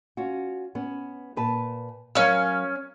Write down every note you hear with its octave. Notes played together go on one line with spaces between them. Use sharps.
C#4 F4 F#4
B3 C#4
A#2 B4 A5
F#3 C#4 A#4 F5 F6